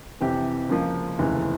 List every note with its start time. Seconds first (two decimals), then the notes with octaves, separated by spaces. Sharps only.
0.20 F2 C3 E3 G4
0.69 C#2 C#3 F3 A#3
1.19 F1 D#2 C#3 E3